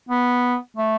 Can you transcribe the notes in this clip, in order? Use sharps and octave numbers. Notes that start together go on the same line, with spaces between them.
B3
A3